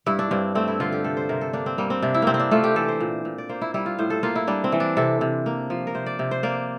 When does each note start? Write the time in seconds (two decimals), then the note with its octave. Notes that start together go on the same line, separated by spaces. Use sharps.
0.06 G2 E4
0.19 D4
0.31 G2 C4
0.55 A3 C4
0.68 E4
0.80 D3 F4
0.92 G4
1.04 C3 A4
1.17 C5
1.29 C3 A#4
1.41 A4
1.53 A#3 D4
1.66 C4
1.78 G3 A#3
1.90 C4
2.02 C3 D4
2.14 E4
2.22 C3 A#3 C4
2.34 C4
2.40 D4
2.51 A3 F4
2.64 G4
2.76 E3 A4
2.89 C5
3.00 A#2
3.25 A#2
3.38 D5
3.49 A#3 C5
3.61 E4
3.74 G3 E4
3.86 F4
3.99 A2 C5
4.10 A4
4.23 A#3 F4
4.36 E4
4.47 G3 D4
4.64 C4
4.72 E3
4.80 D4
4.97 C3 A4
5.21 C3
5.46 A#3
5.70 F3
5.87 A#4
5.95 C3 C5
6.06 D5
6.19 C3
6.31 C5
6.43 A#3 D5